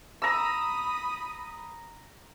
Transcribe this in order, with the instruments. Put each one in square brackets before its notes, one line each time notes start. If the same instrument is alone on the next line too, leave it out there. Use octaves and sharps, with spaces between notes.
[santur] A#5 E6 [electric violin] B5 D#6